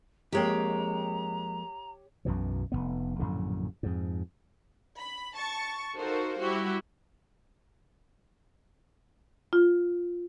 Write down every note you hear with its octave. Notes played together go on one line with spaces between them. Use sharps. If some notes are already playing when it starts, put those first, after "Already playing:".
F2 G#3 A#3 G4 C#5 G5 A#5
B1 F#2 B2 E3
F1 F2 B3
A#1 F#2 A2 D3
F2 G#2
B5
A5 C#6 A6
D#4 F#4 A4 A#4 C5 F5
G3 E4 F#4 G4
F4